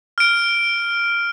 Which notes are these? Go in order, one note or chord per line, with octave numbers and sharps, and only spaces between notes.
F6 D7